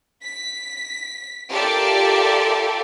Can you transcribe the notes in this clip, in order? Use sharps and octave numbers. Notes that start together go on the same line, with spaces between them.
B6
F4 G4 A4 A#4 D5 E5